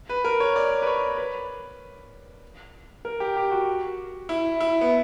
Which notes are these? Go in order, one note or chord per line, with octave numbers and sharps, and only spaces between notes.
B4
A#4
C#5
D5
B4
C#5
B4
A#4
G4
G4
F#4
E4
E4
B3